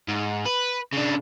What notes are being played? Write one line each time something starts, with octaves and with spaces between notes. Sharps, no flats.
G#2
B4
C#3 D4